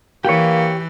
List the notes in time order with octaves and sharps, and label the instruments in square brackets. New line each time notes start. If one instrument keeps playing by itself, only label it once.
[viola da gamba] E3 [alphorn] A#3 [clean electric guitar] G4 C#5